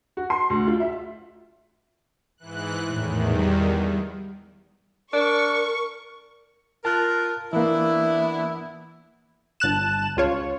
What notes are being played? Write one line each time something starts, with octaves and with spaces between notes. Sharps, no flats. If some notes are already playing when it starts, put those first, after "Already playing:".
F#4
C6
D2
F4
E5
G#2 E3 F#6
E2 A2 D#3
G3
D4 A#4 C#6
F4 A#4 A5 F#6
E3 A#3 B3 D4 E4
G1 A5 F#6 E7
C#2 F4 C#5